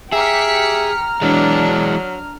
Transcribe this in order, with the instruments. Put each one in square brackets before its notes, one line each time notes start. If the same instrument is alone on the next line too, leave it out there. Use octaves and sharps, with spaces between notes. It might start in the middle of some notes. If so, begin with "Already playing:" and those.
[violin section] G4 B6 C#7 [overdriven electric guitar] G#4 [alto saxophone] E5 [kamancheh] A#5 F6
[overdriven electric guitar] E3 G#3 [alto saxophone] F#3 [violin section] D4